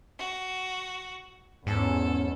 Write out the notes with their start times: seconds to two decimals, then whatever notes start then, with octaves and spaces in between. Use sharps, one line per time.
0.18 F#4
1.67 E2 G#2 C#4 A4